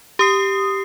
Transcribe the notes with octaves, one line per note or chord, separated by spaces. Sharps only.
G4 D#6 C7